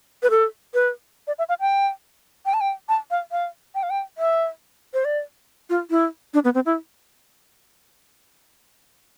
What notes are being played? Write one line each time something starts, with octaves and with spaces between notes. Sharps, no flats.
B4
A4
B4
D5
E5
F5
G5
G5
A5
G5
A5
F5
F5
G5
F5
G5
E5
C5
D5
F4
E4
D4
B3
C4
E4